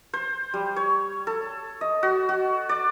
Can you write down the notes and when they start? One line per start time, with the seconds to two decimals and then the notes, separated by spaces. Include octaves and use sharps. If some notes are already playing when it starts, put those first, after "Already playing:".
0.13 C5
0.54 G3
0.76 C#5
1.27 A4
1.81 D#5
2.03 F#4
2.29 F#4
2.69 D5